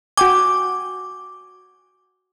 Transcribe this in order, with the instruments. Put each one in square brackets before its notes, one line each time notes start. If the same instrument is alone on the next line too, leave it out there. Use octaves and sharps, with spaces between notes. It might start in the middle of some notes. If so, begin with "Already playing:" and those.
[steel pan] F#4 G5 G#5 [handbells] D6